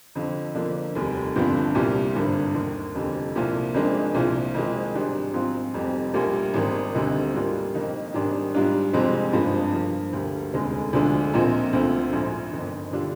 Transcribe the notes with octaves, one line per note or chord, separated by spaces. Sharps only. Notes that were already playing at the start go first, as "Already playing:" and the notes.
F2 D3 F3
F2 D3 F3 A#3 D4
F1 D#2 D#3 G3
G1 G2 F3 C4
C2 A#2 G3
G#1 G2 D3
D#2 D#3 A#3
F1 F2 D3 G3
C2 A#2 F3 A#3
F2 D#3 G#3 D4
C2 A#2 F3
F2 D#3 G#3
G#1 G#2 G3 D4
G#2 F3 C4 F4
F1 F2 C3 G3
A#1 A#2 G3 A#3
G#1 G#2 D#3
D2 D3 G3 C4 D#4
G#2 G3 A#3 D4 F4
F2 D#3 A#3 D#4
G#1 G#2 D#3 G3 D4
G#2 G3 D4 F4
F2 C3 F3 G#3 C4
G#1 G2 F3 G#3
G2 F3 A#3
D2 D3 G3 A#3
F1 D#2 D3 G#3
D2 D3 F3 G#3 D4
A#1 A#2 F3 C4 D#4
D2 D3 F3 C4
A#1 G#2 F3
G1 F2 D#3
D3 G3 D4 F4